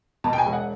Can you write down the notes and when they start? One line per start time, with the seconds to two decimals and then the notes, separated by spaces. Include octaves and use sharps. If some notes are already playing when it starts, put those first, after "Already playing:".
0.24 B2 A5
0.33 G5
0.38 G#5
0.45 E1
0.53 F#5